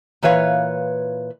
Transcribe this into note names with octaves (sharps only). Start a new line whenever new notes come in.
A#2 E3 B4 C#5 F5